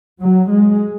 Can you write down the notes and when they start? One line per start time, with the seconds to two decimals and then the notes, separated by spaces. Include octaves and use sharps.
0.21 F#3
0.51 G#3